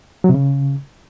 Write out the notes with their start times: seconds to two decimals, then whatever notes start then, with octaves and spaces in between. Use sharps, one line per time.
0.24 F#3
0.29 C3
0.34 C#3